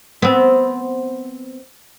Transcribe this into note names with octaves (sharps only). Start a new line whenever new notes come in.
B3 C4